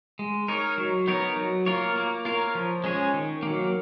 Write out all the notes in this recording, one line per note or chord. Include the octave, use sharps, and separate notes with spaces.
G#3
D#4 A#4 C#5
F#3
B3 D#4 A#4 C#5
F#3
A#3 F4 A#4 C#5
A#3
F4 A#4 C#5
F3
G#3 C#4 G#4 C#5
D#3
F#3 A#3